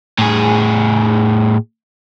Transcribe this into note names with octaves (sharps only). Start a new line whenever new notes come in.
A2 G#4